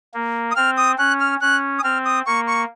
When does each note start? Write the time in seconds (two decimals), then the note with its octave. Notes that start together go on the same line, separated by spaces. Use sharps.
0.14 A#3
0.51 D#6
0.56 C4 F6
0.77 D#6
0.98 C#4 F#6
1.20 F6
1.41 C#4 F#6
1.79 D#6
1.83 C4 F6
2.05 D#6
2.26 A#3 C#6
2.47 C#6